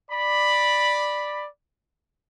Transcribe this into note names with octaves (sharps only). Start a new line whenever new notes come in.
D5 B5